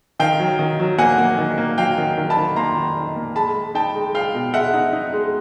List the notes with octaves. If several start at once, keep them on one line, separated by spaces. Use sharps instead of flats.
D#3 F5 G5
F#3
D#3
F#3
A#3 F#5 G#5
A#3
D#3
A#3
F#3 F5 G5
D#3
D#3
A5 B5
D#3
A#3 A#5 C6
D#3
D#3
A#3
G#3 A5 B5
G#3
D#4 G5 A5
G#3
G#3 F5 G5
B2
G#3 E5 F#5
D#4
D#4
G#3